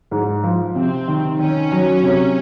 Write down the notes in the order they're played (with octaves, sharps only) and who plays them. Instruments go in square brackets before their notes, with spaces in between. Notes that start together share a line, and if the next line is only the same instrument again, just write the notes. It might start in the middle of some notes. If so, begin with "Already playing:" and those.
[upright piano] G#2
F3
[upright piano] C3 [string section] C4
[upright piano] D#3
[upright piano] D#3 [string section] C#4
[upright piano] F#3
C3